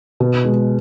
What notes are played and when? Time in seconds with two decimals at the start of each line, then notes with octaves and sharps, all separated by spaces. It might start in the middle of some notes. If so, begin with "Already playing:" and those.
0.20 B2
0.44 G#3